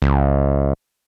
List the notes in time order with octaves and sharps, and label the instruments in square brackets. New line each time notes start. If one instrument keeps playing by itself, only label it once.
[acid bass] C#2